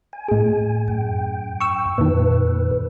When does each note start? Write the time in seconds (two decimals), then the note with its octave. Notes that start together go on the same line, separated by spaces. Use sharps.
0.13 G#5
0.28 A2 G#4
0.88 F#2 G5
1.61 C#6 E6
1.98 F2 A#2 D#3 B4